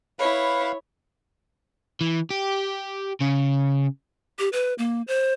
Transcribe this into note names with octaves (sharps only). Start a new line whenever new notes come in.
E4 B4 C#5 F5
E3
G4
C#3
G4
B4
A#3
C5